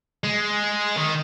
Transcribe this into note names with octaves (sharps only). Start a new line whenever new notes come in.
G#3
D#3